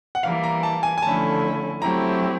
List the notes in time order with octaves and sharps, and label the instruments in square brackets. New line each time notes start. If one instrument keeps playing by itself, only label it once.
[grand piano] F#5
[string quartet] E3 G3 A#3 [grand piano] F5
[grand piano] A#5
A5
G#5
G#5
[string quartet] D3 F3 A3 C#4 E4 [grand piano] A5
[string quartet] F#3 A3 C4 E4 G4 [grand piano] A#5